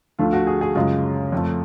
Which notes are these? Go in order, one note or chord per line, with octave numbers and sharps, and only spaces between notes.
D2 D3 F3 A3 F4
F#4
G#4
G#4
F#2 C#3 G#3 F4
F2 F3 A3